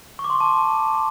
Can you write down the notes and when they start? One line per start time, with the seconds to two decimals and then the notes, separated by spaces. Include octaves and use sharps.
0.19 C#6
0.24 D6
0.30 C6
0.35 C#6
0.40 A5